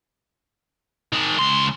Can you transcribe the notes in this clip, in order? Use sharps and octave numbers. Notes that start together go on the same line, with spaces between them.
D#3 G#4
C#2 C6